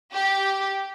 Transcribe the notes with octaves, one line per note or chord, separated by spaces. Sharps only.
G4